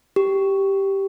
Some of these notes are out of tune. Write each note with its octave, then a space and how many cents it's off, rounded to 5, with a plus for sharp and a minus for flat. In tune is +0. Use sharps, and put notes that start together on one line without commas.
G4 -5